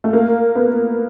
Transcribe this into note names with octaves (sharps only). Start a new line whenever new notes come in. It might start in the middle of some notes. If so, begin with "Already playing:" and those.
A3
A#3
B3